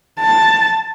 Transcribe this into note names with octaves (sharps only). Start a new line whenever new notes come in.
A5